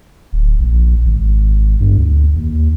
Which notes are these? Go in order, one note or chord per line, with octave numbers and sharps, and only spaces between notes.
D1
A#1
G#1
G2
D2
D#2